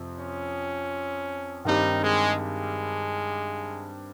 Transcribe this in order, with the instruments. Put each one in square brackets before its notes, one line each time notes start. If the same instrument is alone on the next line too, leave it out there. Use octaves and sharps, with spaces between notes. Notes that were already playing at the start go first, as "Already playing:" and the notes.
Already playing: [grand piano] F2 C3 F3
[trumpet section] C#4
[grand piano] G2 D#3 G3 C4 G4 [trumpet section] D#4
[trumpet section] G#3
G#3